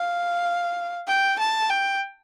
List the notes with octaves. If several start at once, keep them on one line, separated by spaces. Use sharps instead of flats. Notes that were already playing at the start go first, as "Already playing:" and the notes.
Already playing: F5
G5
A5
G5